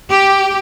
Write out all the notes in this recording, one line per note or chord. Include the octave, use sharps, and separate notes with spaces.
G4